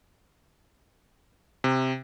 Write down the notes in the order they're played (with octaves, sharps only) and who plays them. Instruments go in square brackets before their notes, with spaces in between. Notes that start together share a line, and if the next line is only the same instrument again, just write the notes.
[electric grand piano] C3